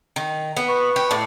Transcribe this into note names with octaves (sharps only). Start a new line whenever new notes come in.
D#3
B3
B4 C#6
G4
A2 D5